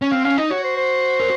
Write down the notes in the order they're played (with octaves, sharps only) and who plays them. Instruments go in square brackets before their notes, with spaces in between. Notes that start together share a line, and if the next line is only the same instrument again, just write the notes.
[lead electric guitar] C#4
[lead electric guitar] C4 [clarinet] F5
[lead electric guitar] C#4 [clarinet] F5
[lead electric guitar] D#4 [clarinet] D#5
[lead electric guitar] F#4 [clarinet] C#5
[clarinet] C5
C5
[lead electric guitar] A#4